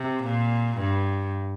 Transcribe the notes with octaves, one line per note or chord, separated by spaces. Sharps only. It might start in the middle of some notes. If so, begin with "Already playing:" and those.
Already playing: C3
A#2
G2